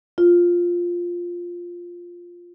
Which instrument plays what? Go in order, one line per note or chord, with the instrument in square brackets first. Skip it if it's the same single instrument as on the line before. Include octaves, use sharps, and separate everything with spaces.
[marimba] F4